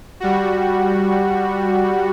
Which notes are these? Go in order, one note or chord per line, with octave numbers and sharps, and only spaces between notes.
G3 F#4